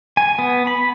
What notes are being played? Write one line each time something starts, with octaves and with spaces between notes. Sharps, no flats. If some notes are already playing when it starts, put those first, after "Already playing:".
G#5
B3
B5